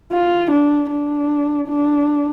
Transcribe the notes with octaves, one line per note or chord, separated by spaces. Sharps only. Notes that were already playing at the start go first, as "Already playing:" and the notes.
F4
D4
D4
D4